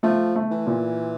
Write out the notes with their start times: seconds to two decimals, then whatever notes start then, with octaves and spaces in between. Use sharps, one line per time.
0.03 F3 A3
0.36 A3
0.51 E3
0.67 A#2